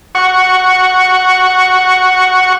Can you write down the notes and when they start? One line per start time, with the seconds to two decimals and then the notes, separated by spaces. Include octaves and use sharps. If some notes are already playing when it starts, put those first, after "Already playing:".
0.15 F#5 C#6